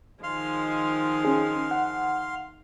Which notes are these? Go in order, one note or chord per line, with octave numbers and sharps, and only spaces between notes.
D#3 F3 G#3 F5 C6
C#4 G#4
F#5